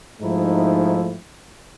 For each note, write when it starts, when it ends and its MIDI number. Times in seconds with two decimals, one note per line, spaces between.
0.21 1.16 44
0.21 1.16 53
0.21 1.16 57
0.21 1.16 63
0.21 1.16 64